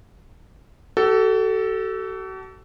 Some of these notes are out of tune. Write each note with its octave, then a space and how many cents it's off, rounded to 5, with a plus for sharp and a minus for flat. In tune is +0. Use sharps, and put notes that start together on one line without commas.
F#4 +45 A4 +0